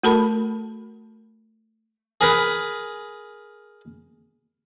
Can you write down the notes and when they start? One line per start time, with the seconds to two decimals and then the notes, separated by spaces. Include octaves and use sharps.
0.03 A3 F#4 A4 A#4 A5 B5
2.21 G#4 A#4 B4